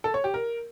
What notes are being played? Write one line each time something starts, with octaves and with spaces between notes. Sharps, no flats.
A4
C#5
G4
A#4